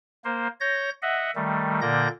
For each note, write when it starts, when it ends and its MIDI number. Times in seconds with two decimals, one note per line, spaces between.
0.24 0.47 58
0.24 0.47 72
0.60 0.90 73
0.60 0.90 91
0.60 0.90 94
1.02 1.31 75
1.02 1.31 76
1.02 1.31 78
1.35 1.80 51
1.35 1.80 55
1.35 1.80 57
1.81 2.08 46
1.81 2.08 50
1.81 2.08 58
1.81 2.08 74
1.81 2.08 91
1.81 2.08 94